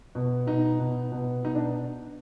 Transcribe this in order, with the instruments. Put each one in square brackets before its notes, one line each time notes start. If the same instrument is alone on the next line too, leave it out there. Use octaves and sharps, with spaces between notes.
[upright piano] B2
B2 D#4
B2
B2
B2 D#4
D4